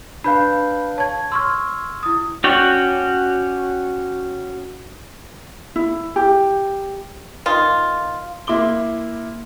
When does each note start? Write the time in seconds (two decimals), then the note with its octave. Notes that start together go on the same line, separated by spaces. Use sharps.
0.24 D4 B4 F5 B5 G6
0.98 C#5 A5 G#6
1.32 C6 C#6 E6 F6 G#6
2.03 E4 D#6
2.44 C#4 F#4 C#5 D5 G5
5.76 E4
6.16 G4
7.46 D#3 F4
8.47 A#3 E4 C6 D6 G7